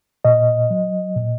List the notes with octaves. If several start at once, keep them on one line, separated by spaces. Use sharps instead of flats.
A#2 D#5
F#3
A#2